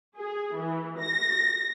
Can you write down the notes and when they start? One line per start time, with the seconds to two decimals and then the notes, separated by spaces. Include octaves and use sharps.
0.18 G#4
0.57 E3
0.99 A#6